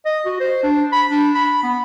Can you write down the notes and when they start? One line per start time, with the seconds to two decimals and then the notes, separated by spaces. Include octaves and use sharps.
0.06 D#5
0.26 F#4
0.40 C5
0.63 D4
0.92 B5
1.10 D4
1.35 B5
1.63 B3